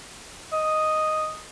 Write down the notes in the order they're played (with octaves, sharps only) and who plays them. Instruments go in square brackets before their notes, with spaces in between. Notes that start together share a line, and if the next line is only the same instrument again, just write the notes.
[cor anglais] D#5